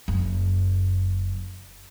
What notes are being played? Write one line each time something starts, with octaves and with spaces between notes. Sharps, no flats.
F#1 F#2